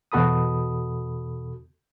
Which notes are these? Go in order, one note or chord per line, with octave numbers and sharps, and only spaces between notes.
E2 B2 F#4 A4 B5 D#6